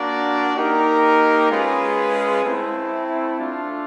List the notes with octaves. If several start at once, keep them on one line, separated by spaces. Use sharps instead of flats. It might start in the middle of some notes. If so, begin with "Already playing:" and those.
Already playing: A#3 D4 F#4 A#4 D5
A#3 D#4 G4 A#4
G#3 C#4 F4 G#4 B4
A3 C4 E4
A3 D4 F4